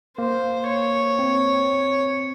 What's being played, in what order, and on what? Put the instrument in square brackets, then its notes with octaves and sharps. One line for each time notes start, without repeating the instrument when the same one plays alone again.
[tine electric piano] A#3 [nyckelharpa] C5
[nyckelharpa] C#5
[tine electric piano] C4